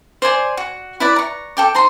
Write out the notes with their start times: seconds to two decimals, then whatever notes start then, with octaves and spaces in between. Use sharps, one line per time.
0.22 C5 D5 G#5 C6
0.57 F#4
1.00 E4 B4 D5
1.16 A#5 C#6
1.57 A4 G5 D6
1.74 D#4 C5 A#5 C6